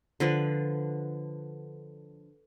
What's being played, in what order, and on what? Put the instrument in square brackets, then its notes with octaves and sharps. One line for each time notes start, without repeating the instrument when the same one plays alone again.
[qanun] D3 F3 B4